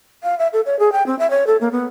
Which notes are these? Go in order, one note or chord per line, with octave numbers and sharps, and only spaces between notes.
F5
E5
A4
C#5
G#4
G5
C4
E5
C#5
A4
A#3
B3